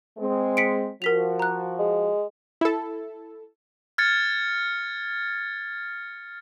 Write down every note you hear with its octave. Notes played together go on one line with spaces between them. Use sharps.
G#3 C4
B6 C#7 D7
F3 F#4 A#4 B6 F7
A#5 F#6
G#3
E4 A4
F6 G#6 A6 C#7